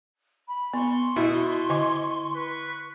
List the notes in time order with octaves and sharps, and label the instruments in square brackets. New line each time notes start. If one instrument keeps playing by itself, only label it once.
[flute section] B5
[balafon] B3 [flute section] C6 C#6
[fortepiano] B2 [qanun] E4 [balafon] E5
[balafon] D3 D#5 D6 [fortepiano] G#5
[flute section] B4 C#6